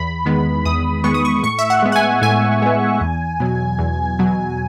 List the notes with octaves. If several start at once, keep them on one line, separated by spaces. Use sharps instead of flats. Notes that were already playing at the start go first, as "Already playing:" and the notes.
Already playing: E2 B5
D#3 G#3 B3
E2 D#6
D#3 G#3 B3 C#6
D#6
C#6
A2 C#6
E5
F#5
G#3 B3
F#5
G#5
A2 G#5
G#3 B3
E2
B2 F#3
E2
B2 F#3